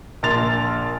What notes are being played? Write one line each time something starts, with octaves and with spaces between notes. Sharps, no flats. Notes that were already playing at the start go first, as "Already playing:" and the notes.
A#1 A#4 C6 A6 F7